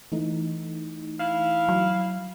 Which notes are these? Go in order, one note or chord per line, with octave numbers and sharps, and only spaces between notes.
E3 A3 D#4
E4 F5
F#3